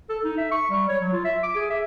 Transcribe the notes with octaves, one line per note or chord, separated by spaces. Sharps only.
A4
D#4
E5
C#6
G3
C#5
F#3
F4
E5
D6
G#4
E5